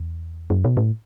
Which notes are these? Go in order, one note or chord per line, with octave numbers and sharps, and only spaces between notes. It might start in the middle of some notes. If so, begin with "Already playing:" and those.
Already playing: E2
F#2
B2
A2